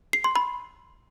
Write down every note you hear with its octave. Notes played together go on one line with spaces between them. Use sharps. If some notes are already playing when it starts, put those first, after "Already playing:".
C7
C6
B5